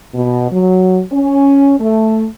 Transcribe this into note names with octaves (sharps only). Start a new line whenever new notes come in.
B2
F#3
C#4
A3